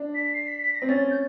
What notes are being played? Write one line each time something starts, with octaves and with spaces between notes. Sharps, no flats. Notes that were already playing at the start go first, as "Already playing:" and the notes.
Already playing: D4
B6
C7
B6
B6
A#6
C4
C#4 A6
G6